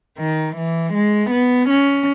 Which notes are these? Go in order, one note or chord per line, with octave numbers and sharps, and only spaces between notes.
D#3
E3
G#3
B3
C#4